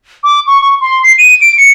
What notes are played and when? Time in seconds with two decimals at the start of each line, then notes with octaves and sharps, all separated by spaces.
0.24 D6
0.47 C#6
0.61 C#6
0.81 C6
1.03 C7
1.18 D#7
1.41 D7
1.58 C#7